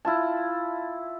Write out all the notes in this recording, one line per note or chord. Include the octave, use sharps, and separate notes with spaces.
E4 F4 A5